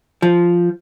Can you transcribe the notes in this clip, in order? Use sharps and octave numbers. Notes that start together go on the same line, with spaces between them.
F3